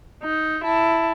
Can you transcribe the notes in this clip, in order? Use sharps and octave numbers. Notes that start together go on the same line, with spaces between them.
D#4
E4 A5